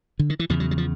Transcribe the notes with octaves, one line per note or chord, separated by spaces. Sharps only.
D3
D#3
E3
E2 C#3 F3
F#3
F#3
F3